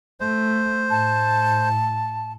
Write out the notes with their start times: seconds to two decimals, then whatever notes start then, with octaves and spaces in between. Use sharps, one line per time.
0.20 A3 C5
0.90 A2 A5